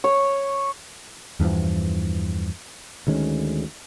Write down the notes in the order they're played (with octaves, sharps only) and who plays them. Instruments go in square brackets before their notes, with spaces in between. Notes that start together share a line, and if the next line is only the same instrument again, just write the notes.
[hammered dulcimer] C#5
[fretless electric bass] E2 G2 E3 F3
D2 D#3 G#3 C#4